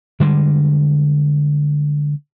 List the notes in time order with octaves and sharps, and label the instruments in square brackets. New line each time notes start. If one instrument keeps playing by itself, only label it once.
[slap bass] D3 G3 G#3